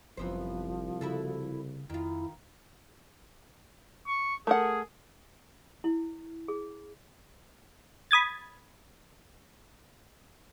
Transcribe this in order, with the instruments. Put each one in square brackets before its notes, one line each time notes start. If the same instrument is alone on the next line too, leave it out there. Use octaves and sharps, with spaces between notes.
[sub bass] G1 [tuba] C2 [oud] F#2 B3 C5 [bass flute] F3
[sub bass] C#3 [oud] E4 F#4 A4
[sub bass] F2 [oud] D#3 F4 [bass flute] E4
[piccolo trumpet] C#6
[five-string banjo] A3 A#4 F#5 [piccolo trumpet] G#4
[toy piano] E4
G#4
[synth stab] B5 D#6 G#6 A6